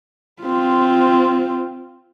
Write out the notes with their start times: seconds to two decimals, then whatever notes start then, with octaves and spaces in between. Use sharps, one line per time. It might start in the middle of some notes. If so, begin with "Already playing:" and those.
0.42 C4 F4